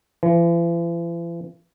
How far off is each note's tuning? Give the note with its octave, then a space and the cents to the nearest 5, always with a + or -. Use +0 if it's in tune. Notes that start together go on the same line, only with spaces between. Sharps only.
E3 +45